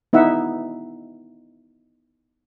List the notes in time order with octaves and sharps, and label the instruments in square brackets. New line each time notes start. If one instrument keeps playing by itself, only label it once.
[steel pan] B3 D#4 E4 E5 F#5